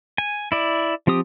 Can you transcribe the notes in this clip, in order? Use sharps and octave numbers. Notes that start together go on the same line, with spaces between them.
G#5
E4 D5
F3 C4 G4 D#6